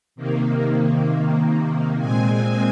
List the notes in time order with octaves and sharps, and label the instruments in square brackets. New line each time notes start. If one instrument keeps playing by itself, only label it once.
[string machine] C3 D#3 A#3
A#2 G#3 C4 G#5